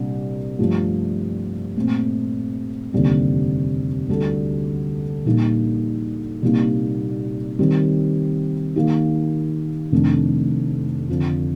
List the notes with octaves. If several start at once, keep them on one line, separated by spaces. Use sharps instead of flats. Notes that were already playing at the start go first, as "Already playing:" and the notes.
Already playing: C2 A#2 G3 D4
G2 F3 A3
A#2 A3 C4
F1 D#2 D3 G3 C4
D2 D3 G3 D4 A4
A#1 A#2 G3 A#3 D#4
C2 A#2 G3 A#3 D#4
D#3 G3 C4
D#3 A#3 D#4 G4
F1 F2 D#3 A3 D4
F2 D3 F3